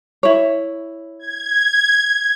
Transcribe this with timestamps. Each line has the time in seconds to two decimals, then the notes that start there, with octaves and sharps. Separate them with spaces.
0.23 E4 C#5
1.19 G#6